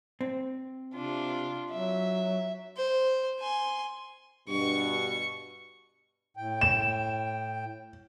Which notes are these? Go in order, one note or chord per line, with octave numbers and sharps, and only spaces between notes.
C4
C3 D4 F4
F#3 E5
C5
G#5 C6
G2 B2 C#6
A2 G5
E7